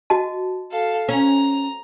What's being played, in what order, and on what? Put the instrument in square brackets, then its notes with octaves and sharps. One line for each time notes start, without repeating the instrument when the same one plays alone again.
[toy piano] F#4 D#5 A5
[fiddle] A4 F5
[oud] C#4 [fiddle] A#5